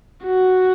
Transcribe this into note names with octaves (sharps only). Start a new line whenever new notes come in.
F#4